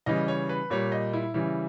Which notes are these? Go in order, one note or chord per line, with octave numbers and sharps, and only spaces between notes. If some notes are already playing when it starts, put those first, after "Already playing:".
C#3 E3 G3 D#5
C#5
B4
A#2 G3 C#5
D#5
E4
C#3 E3 G3 E4